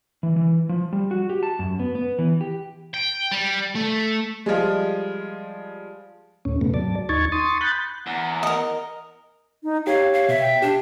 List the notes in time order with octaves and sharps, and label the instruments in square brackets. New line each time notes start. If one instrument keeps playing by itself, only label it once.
[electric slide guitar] E3
E3
F3
G3
F#4
G4
A5
F#2
B3
B3
E3
G4
[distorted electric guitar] G5
G3
A3
[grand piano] F3 G3 G#3
[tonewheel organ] D#2 A2 C#4
E2 G#2 C3 A3 B3
G#2 F#3 D5 A5
D#2 D#4 C#6 G#6 A6
C6 C#6 D#6 A6
B5 F#6 G6 A6
[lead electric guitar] E2 [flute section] F#5 A#5
[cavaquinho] A#4 D#5
[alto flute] D#4
[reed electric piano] G4 [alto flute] C#5 [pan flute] F5
[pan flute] F5
[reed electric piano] B2 [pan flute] E5
[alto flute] G5
[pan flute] D4 [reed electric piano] G4